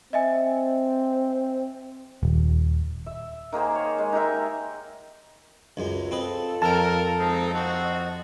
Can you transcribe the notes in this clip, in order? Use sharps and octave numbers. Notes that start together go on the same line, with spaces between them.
C4 D#5 E5 G#5
D#1
E5
D#3 A#3 G#4 C5
C#5
G#3
D#4 G4 A#4 E5
C#2 F#2 G#3
C4 F4 A4 B4 D#5
F2 A#4 G5 A5
G#3 C4 D#4
F3 C4 F#4 D#5